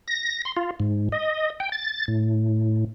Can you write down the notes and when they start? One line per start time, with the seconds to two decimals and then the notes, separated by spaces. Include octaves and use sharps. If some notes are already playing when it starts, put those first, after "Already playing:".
0.08 A#6
0.45 C6
0.57 F4
0.80 G#2
1.12 D#5
1.60 G5
1.72 A6
2.08 A2